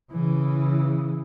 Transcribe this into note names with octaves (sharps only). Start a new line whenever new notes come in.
C#3 E3